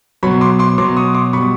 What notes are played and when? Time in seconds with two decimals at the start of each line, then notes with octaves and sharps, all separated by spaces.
0.23 B2 F#3 B5 C#6
0.41 C6 D6
0.59 C6 D6
0.78 B2 F#3 C6 D6
0.97 C#6 D#6
1.14 C6 D6
1.33 B2 G3 B5 C#6